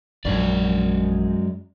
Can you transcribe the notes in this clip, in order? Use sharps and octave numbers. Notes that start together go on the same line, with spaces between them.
A#1 F#2 F#3 G#3 D5